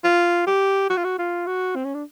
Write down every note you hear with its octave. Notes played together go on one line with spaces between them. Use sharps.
F4
G4
F#4
F4
F#4
F4
F#4
C4
C#4
D4